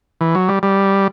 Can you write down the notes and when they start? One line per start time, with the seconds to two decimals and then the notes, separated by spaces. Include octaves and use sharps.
0.21 E3
0.35 F#3
0.49 G3
0.63 G3